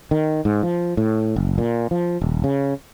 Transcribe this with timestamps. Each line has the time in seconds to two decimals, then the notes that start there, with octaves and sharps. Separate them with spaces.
0.11 D#3
0.45 G#2
0.63 F3
0.97 A2
1.36 F#1
1.58 A#2
1.91 F3
2.22 D#1
2.44 C#3